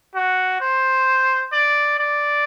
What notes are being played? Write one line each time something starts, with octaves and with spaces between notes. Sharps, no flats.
F#4
C5
D5
D5